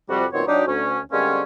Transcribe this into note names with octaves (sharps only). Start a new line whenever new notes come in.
F2 C3 G3 F#4
F#2 A#2 D#3 B3 C4 C#5
F#3 D4 D#4 G4
D2 C#4
D3 G3 G#3 A#3 C4 C#4